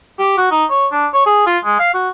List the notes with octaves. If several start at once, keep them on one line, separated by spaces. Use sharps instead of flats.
G4
F#4
D#4
C#5
D4
C#5
G#4
F4
G#3
F5
F#4